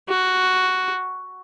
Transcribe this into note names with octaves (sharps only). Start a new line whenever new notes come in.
F#4